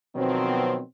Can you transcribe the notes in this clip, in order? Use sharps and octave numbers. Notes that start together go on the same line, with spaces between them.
B2 D#3 F3 F#3 B3 C4